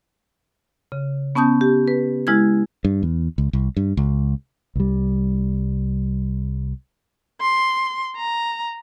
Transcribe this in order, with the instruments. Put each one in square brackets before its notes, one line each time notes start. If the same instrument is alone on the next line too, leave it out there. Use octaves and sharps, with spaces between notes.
[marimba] C#3
B3 C#4 A5 D#6 G6
G4
B4
G#3 E4 F6 G#6
[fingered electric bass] G2
E2
C#2
C2
G2
C#2
C2 G3
[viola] C6
A#5